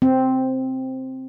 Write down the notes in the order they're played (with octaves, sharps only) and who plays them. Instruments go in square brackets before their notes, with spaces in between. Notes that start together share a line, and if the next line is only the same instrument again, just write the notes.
[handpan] C4